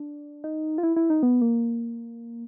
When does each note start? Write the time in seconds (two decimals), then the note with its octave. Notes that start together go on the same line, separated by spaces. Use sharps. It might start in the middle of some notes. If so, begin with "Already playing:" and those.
Already playing: D4
0.44 D#4
0.78 F4
0.83 E4
0.96 E4
1.10 D#4
1.23 B3
1.42 A#3